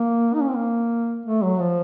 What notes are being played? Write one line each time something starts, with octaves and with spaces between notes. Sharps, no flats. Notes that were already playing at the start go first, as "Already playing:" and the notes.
Already playing: A#3
D#4
C#4
C4
A#3
A3
F#3
F3